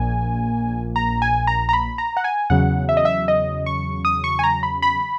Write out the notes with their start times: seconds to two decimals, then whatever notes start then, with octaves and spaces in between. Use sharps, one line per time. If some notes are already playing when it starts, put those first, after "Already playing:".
Already playing: A#1 A#2 A#3 G#5
0.96 A#5
1.22 G#5
1.47 A#5
1.69 A#5
1.73 B5
1.98 A#5
2.17 F#5
2.24 G#5
2.50 E2 C#3 F#3 F#5
2.89 E5
2.97 D#5
3.05 E5
3.28 D#5
3.66 C#6
4.05 D#6
4.24 C#6
4.39 G#5
4.43 A#5
4.63 B5
4.82 B5